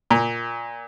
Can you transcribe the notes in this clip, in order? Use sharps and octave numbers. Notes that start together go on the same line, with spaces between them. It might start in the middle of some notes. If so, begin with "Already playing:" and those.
A#2